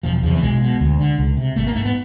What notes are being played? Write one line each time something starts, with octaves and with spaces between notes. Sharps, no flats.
E1 F3
E2 C3 F3
E3
B1 G#3
B2
D2
D3
C#2
C3
G#1 A3
A#3
G#2 A3
B3